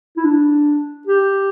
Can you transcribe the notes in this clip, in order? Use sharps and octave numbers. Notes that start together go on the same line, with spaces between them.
E4
D4
G4